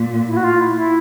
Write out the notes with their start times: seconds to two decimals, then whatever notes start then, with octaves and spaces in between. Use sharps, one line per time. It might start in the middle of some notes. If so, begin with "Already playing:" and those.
Already playing: A#2
0.27 E4
0.37 F#4
0.44 F4
0.60 E4
0.77 E4